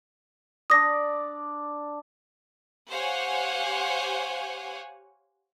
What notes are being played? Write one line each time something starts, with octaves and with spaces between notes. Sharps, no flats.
D4 D5 D#6 A#6
G4 C5 C#5 F5 F#5 G#5